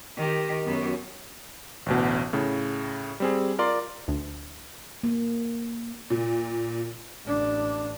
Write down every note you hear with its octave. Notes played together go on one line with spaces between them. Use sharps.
D#3 G4
F#2 F#3 B3
A1 D2 B2
A2 C#3
G3 C4 G#4
F4 A#4 D5 C6
D2
A#3
A#2
A1 D4